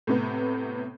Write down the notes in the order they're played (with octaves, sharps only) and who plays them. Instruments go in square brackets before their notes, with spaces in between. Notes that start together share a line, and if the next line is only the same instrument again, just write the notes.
[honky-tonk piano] A2 C3 B3